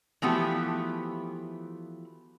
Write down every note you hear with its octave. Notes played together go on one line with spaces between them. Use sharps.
E3 F3 A3 B3 F#4 G4